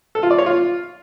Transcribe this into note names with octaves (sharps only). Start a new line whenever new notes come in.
A4
F4
D5
C#5
F4